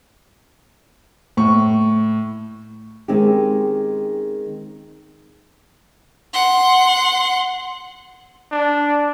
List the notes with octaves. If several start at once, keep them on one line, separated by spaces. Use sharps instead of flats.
A2 C#6
D#3 G#3 C4 C#4 D#4 G4
F#5 C6
D4